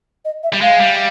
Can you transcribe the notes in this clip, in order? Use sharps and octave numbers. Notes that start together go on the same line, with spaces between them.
D#5
E5
G3
G#3 F5
G3